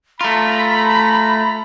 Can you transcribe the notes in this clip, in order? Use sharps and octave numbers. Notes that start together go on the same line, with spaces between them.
A3 F4 A#5 B5